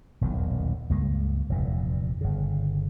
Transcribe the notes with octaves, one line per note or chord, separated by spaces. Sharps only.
D#1 B1 E2 D#3
C#2 G2 G#3 A#3
F1 E2 G2 A#2
G1 C#3